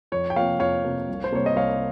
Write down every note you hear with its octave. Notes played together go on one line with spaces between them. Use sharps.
F2 C#5
G5
C3 F3 A#3 C#5 F5
F2 C#5 F5
C3 F3 A#3
C2
C5
C3 G3 A#3 C#5
D#5
C2 C#5 F5